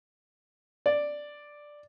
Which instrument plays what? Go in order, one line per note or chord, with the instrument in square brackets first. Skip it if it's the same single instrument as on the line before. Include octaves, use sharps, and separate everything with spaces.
[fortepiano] D5